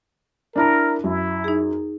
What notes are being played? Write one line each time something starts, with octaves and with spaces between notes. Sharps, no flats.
D4 E4 A#4 A#5
F#2 E4
D#4 G#4